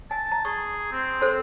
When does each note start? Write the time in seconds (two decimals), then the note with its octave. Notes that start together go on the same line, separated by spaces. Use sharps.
0.11 G#5 A5
0.32 A#5
0.45 G#4 C#6
0.92 C4
1.21 A4 C5 C6